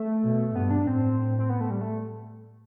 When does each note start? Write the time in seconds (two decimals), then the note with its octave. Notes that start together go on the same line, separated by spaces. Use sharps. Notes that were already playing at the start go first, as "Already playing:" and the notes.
Already playing: A3
0.24 B2
0.55 G2 B3
0.70 D4
0.87 A2 C4
1.39 C4
1.49 B3
1.61 A3
1.70 G3
1.81 A3